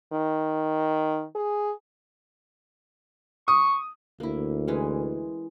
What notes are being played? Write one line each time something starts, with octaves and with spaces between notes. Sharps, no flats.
D#3
G#4
C#6 D#6
D2 A#3 E4
E3 G#3 C#4